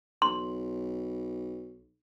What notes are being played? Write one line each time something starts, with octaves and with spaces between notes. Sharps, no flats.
B1 C6